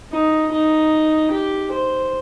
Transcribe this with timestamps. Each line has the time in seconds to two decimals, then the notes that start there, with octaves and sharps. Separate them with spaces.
0.12 D#4
0.52 D#4
1.31 G4
1.71 C5